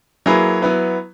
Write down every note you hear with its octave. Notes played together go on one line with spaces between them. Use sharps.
F#3 A#3 E4 G#4 B4
F#3 B3 E4 B4